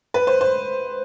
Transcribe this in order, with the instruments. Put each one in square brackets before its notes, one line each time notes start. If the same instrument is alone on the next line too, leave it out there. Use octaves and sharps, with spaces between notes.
[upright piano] B4
C5
C5